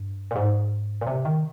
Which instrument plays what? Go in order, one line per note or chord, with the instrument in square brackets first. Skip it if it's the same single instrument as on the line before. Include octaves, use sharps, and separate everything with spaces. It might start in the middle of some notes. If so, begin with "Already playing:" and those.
Already playing: [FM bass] G2
A#2
G#2
A#2
C3
D#3